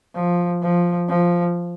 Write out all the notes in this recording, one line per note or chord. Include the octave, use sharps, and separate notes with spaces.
F3
F3
F3